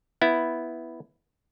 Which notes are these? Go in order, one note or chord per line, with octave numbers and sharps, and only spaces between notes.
B3 E4